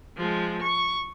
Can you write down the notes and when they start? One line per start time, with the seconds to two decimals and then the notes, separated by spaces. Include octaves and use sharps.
0.17 F3 G#3
0.62 C#6